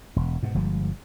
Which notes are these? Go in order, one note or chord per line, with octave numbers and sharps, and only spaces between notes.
E1
G#2 B2
G1 F3 G#3